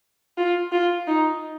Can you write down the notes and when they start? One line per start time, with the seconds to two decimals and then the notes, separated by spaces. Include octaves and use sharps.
0.38 F4
0.72 F4
1.07 D#4